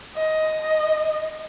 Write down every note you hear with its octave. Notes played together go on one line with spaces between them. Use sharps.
D#5